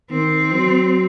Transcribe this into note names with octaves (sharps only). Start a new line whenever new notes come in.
D#3 C4
F#3